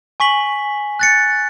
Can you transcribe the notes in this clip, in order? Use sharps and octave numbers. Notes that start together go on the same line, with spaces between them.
G#5 C#6 B6 F#7
F#6 A6 C#7